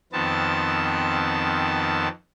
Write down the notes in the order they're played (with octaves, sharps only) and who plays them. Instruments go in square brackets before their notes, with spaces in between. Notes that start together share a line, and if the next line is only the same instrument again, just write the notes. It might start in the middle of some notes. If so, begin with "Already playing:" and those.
[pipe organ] F2 D#3 B3 C4 A5